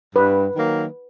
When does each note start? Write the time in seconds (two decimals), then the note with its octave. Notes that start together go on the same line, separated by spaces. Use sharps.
0.15 G2 B4
0.54 D#3 F#3 A#3